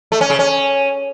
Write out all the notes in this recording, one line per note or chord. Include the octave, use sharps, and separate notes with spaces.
A3
C#4
C#3
C#4